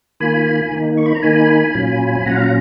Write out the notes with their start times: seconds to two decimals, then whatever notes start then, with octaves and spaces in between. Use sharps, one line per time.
0.20 D#3 A#3 F4 G#5 B5
0.71 D#3 A#3 D#4
0.97 C#6
1.06 B5
1.15 A#5
1.23 D#3 A#3 D#4 G#5 B5
1.74 A#2 F#3 C#4 F4
2.26 A#2 F#3 C#4 F4 F#5 A#5
2.37 F5
2.45 F#5